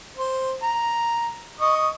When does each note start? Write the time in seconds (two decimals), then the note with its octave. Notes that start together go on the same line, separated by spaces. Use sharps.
0.17 C5
0.63 A#5
1.61 D#5 C#6 D#6